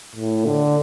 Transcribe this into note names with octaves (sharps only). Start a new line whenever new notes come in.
A2
D3